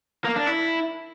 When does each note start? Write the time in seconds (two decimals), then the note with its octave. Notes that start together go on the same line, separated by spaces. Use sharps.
0.25 A#3
0.36 D4
0.47 E4